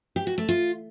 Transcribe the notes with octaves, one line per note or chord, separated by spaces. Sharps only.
G4
F#4
A3
F4